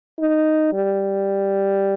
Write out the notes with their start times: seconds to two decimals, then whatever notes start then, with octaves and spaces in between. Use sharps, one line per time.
0.19 D#4
0.73 G3